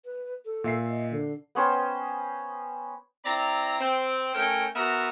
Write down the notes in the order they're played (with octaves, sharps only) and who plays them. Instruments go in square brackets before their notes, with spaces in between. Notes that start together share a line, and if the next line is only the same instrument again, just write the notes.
[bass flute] B4
A4
[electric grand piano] A#2 E5 C7
[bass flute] D#5
D3
[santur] B3 C#4 C5 G5
[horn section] C4 E4 D5 A#5
C4
A3 C#4 A#4 C#5 G5
B3 F#4 A#4 E5 A#5